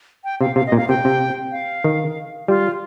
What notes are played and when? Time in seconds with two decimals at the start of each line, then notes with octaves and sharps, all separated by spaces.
0.24 G5
0.41 C3 F5
0.56 C3 F5
0.67 D#5
0.72 A#2
0.78 F5
0.89 C3 G5
1.05 C3
1.52 F5
1.84 D#3
2.48 G3 F4